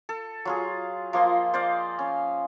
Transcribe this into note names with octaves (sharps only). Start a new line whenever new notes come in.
A4
F#3 F4 G#4
F3 A#3 D#5 C6
C5 D5 D#5 F5
C#4